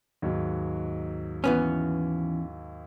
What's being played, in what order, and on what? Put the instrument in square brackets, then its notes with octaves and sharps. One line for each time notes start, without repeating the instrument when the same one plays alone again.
[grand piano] D#2 G#2 F#3
[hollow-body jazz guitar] E3 B3 C#4